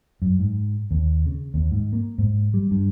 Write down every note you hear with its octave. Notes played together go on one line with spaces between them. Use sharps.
F#2
G#2
D#2
C#3
D#2
G#2
A#3
G#2
G3
G2